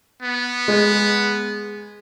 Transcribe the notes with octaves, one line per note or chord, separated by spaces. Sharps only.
B3
G#3